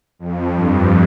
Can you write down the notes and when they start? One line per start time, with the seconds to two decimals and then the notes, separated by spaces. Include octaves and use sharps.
0.19 F2
0.54 G2